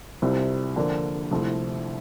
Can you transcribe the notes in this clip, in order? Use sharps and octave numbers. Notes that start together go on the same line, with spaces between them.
C2 C3 G3 C4 F4
D3 F3 A#3 D4
C2 C3 F3 A3 E4